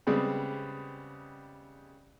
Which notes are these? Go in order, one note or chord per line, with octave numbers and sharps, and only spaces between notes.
C#3 G3 G#3 B3 C4